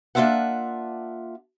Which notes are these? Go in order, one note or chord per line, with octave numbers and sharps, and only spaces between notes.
A#3 D4 E4 F4 E5 F#5